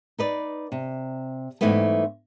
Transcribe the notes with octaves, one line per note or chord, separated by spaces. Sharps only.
D#4 B4 D5
C3
G#2 E3 G3 A3 B3